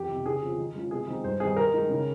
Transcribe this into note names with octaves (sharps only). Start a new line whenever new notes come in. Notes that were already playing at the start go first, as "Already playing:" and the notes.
Already playing: F2 G4
C3 D#3
C#3 G#4
F3 C4 F4
D#3
G#3 C#4 F4
C3 G#4
D#3 G#3 C4 D#4
G2 C5
D#3 G3 C4 G#4
D#3 A#4
G#3 D#4
C#3